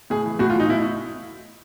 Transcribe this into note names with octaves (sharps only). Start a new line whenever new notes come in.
A2 G#4
E3
A2 F#4
F4
E3
D#4
A2 E4